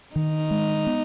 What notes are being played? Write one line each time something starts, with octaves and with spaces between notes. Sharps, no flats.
D#3 D#4
G#3
B3